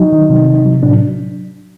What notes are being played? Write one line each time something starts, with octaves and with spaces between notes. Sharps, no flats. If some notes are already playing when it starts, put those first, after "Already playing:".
Already playing: F#3 D#4
D#3
C3
C3
F#3
A2 D4